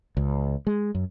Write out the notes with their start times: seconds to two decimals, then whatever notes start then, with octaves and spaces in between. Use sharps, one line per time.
0.17 C#2
0.67 G#3
0.95 F#2